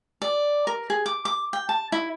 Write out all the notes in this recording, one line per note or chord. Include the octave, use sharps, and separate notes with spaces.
D5
A#4
G#4
D6
D6
G5
A5
E4